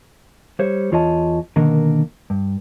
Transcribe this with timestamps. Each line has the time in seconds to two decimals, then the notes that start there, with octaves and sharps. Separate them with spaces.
0.59 G3 C5 C#5
0.92 E2 F4 C#5 D#5 A5
1.56 B2 D3 D#3 A#3 A#4
2.30 G2